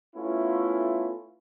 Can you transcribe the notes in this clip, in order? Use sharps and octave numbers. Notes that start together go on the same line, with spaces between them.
A3 B3 C#4 E4 F4